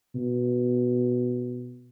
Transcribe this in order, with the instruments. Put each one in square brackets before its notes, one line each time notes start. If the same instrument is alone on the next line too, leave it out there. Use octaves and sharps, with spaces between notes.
[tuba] B2